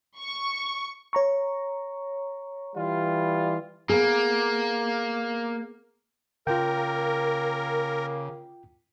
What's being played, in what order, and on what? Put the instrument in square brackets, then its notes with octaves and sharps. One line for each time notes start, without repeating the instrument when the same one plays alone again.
[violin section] C#6
[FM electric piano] C#5 A#5 C#6
[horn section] E3 G3 F4
[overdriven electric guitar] A#3 [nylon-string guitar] B3 G#4
[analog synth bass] C#3 [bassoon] A#3 [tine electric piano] F4 G5 [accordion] A#4